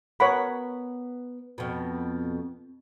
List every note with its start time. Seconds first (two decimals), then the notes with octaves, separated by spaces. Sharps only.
0.20 B3 A#4 C#5 F#5 B5
1.58 F2 B2